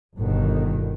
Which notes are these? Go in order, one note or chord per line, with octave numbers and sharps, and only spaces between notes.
G1 B2 D#3